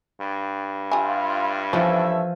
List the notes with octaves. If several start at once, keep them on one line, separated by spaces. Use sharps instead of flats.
G2
E4 F4 G4 G#5
E3 F3 B3 C#4 A4 C#5 E5